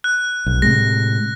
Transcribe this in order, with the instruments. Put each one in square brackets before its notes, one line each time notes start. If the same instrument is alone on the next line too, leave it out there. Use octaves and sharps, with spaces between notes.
[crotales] F#6
[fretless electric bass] B1
[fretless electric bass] A2 C3 G#3 [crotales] A#6